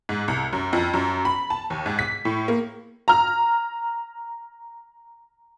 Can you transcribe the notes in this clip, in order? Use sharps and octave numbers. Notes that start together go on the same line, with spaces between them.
G#2
C2
F#2
F2
F#2
B5
A5
D#2
G#2
B6
A2
A#3
A#5 F6